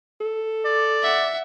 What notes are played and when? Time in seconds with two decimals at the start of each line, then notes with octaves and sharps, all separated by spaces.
0.21 A4
0.65 D5
1.03 E5 F#5